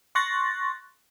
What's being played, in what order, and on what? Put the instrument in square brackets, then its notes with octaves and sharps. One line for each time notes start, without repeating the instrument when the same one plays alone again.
[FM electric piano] C6 C#6 F#6 A6 A#6